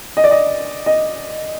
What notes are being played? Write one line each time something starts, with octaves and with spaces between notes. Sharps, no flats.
D#5
D5
D#5
D#5